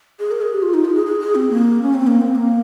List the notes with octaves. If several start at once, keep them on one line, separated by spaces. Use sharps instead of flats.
G#4
A#4
G#4
G4
F4
D#4
F4
G#4
G#4
G#4
C4
A#3
C#4
C4
A#3
C4
A#3